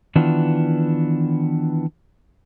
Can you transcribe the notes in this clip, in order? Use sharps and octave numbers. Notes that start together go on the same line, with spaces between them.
D#3 E3 B3 D4 F4